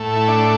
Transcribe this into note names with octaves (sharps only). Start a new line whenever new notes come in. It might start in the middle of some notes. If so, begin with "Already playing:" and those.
Already playing: A2 A3
E4
D4